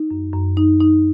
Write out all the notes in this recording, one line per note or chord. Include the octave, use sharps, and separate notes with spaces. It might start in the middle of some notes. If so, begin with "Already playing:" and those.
Already playing: D#4
F#2
F#2
D#4
D#4